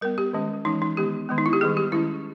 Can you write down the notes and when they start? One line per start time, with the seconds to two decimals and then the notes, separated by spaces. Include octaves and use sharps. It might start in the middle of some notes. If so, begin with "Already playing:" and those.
0.01 G3 B3 A#4
0.18 G4
0.33 D#3 G#3 C#4
0.65 E3 G#3 C#4 D#4
0.82 D#4
0.97 D#3 G#3 B3 G4
1.29 D#3 G#3 B3
1.38 D#4
1.46 E4
1.53 G4
1.61 D#3 G3 B3 G#4
1.77 G4
1.92 D#3 G#3 C#4 E4